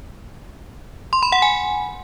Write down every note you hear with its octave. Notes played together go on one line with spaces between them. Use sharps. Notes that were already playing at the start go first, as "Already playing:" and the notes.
C6
B5
F#5
G#5